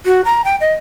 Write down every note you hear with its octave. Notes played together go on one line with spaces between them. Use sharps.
F#4
A#5
G5
D#5